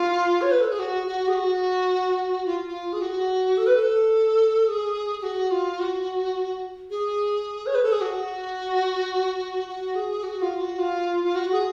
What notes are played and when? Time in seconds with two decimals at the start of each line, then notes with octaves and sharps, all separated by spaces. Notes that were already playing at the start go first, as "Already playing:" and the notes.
Already playing: F4
0.42 C#5
0.51 B4
0.61 A4
0.70 G#4
0.79 F#4
1.07 F#4
1.28 G#4
1.34 F#4
2.45 F4
2.68 F4
2.93 G#4
3.01 F#4
3.57 A4
3.66 B4
3.76 A4
4.68 G#4
5.20 G#4
5.23 F#4
5.51 F4
5.80 F#4
6.90 G#4
7.66 C#5
7.75 B4
7.83 A4
7.92 G#4
8.01 F#4
9.68 F#4
9.95 G#4
10.23 F#4
10.42 F4
10.61 F#4
10.79 F4
11.24 F4
11.35 F#4
11.52 G#4